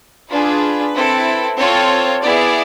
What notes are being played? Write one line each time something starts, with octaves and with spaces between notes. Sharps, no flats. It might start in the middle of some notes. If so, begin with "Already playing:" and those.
D4 F4 G#4 B4
C4 E4 A4
C4 F4 A4 C#5
B3 E4 G#4 D5